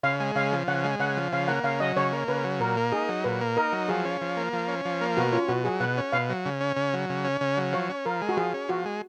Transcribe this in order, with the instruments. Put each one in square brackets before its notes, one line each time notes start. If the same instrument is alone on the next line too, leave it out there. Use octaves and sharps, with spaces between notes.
[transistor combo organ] C#3 [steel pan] F5
[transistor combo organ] G#3
[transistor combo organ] C#3 [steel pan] F5
[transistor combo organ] F3
[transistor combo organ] C#3 [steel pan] F#5
[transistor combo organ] G#3
[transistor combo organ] C#3 [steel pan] F#5
[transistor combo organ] F3
[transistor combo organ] C#3 [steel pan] F5
[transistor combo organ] A#3 [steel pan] F#5
[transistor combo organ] C#3 [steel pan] F5
[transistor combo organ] F#3 [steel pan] D#5
[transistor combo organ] C#3 [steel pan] C#5
[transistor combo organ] A#3
[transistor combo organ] C#3 [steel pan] B4
[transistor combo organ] F#3
[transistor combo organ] A#2 [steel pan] A#4
[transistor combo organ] A#3
[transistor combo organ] D#4 [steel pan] G#4
[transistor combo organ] F#3
[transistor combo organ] A#2 [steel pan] B4
[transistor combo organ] A#3
[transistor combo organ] D#4 [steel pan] A#4
[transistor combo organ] F#3
[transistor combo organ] F3 [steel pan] G#4
[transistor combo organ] C#4
F3
A#3
F3
C#4
F3
A#3
[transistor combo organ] B2 [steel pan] F#4
[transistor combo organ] C#4 [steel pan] F4
[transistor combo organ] B2 [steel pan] F#4
[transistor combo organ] F#3 [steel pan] G#4
[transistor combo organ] B2 [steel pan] F#5
[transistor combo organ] C#4
[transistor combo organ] B2 [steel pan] F5
[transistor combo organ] F#3
C#3
C#4
C#3
F#3
C#3
C#4
C#3
F#3
[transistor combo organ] F3 [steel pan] C#5
[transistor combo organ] C#4
[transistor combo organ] F3 [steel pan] A#4
[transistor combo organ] G#3
[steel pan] F#4
[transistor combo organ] F3 [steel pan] G#4
[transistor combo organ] C#4
[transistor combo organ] F3 [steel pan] F#4
[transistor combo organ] G#3